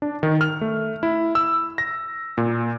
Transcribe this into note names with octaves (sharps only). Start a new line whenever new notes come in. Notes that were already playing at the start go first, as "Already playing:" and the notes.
D4
D#3
F6
A3
E4
E6
A#6
A#2